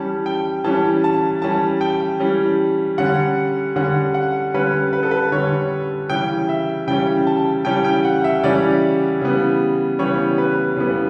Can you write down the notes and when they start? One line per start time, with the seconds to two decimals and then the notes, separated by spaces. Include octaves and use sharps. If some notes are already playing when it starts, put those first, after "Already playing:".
Already playing: E3 G3 C#4 A5
0.26 G5
0.64 E3 G3 C#4 A5
1.04 A5
1.42 E3 G3 C#4 A5
1.81 G5
2.20 E3 G3 C#4
2.98 D3 G3 C#4 F#5
3.76 D3 G3 C#4 F#5
4.14 F#5
4.54 D3 G3 C#4 B4
4.93 B4
5.03 A4
5.11 B4
5.32 D3 G3 C#4 C#5
6.09 C#3 E3 G3 C#4 G5
6.49 E5
6.87 C#3 E3 G3 C#4 G5
7.27 A5
7.65 C#3 E3 G3 C#4 G5
7.84 G5
8.05 F#5
8.24 E5
8.43 C#3 E3 G3 C#4 D5
9.21 C#3 E3 G3 B3
9.99 C#3 E3 G3 B3 C#5
10.38 B4
10.77 C#3 E3 G3 B3